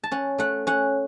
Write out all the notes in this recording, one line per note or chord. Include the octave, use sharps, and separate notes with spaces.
A5
C#4 F#5
A3 F#5
C#4 F#5